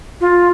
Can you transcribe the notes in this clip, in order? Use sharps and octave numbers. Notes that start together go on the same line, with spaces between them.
F4